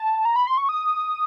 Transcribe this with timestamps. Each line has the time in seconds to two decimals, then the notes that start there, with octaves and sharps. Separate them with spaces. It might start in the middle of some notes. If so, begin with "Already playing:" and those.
Already playing: A5
0.25 A#5
0.36 B5
0.47 C6
0.58 C#6
0.69 D#6